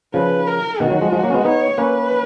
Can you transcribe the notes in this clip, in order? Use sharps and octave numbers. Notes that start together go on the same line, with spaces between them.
C#3 F3 B4
A#4
B2 D#3 F#4
D#3 F#3
F3 G#3
F3 G#3
F#3 A#3
C#4
G#3 B3
B3 D#4 C#5
A#3 C#4 B4